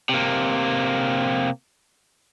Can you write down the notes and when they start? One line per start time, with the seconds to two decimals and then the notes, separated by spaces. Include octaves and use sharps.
0.09 C3 A#3